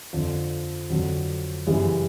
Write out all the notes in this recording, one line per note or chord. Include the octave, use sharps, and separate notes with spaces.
F2 D3 F3
F2 D3 F#3
F#2 C#3 E3 G3